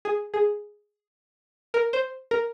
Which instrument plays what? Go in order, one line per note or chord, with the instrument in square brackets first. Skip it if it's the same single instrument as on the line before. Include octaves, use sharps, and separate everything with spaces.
[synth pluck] G#4
G#4
A#4
C5
A#4